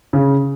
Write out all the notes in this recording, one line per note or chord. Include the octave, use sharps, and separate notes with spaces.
C#3